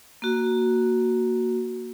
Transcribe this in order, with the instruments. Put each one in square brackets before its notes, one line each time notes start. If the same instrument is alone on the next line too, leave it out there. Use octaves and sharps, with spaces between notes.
[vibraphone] A#3 F#4